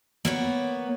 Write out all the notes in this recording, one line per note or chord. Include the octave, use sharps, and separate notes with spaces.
A#3 B3 C#5